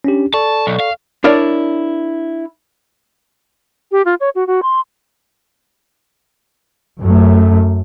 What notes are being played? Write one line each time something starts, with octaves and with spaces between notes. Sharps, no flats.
C#4 D4 G4
A4 D5 A5 C#6
B1
F5
D4 E4 A#4 C#5 D5
G4
F4
C#5
F#4
F#4
C6
F#2 F#3 A3